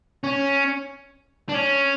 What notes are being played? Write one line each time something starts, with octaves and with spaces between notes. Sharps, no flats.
C#4
D4
C#4